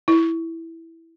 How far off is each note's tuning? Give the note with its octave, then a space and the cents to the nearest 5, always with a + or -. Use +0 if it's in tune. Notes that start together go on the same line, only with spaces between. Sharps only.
E4 -5